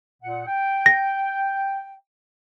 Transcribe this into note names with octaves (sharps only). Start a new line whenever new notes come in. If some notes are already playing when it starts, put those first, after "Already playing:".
A#2 F#5
G5
A#6